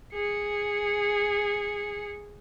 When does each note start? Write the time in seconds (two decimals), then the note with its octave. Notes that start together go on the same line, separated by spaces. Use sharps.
0.14 G#4 C#7